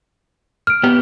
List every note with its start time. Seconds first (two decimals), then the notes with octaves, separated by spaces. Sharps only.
0.67 F6 D7
0.84 B3 G4